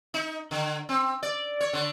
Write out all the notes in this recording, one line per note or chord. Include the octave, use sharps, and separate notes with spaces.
D#4
D3
C4
D5
C#5
D3